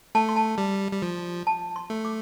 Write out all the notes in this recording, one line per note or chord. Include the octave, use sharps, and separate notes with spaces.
A3 A5
C6
A5
G3
G3
F3
A5
C6
A3
D6